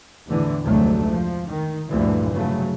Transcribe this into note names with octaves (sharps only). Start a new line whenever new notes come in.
E2 A2 D3 E3
F1 D2 G#2 F#3 A3
F3
D#3
D2 G2 A#2 D3 E3 F3
F1 C#3 F#3 A3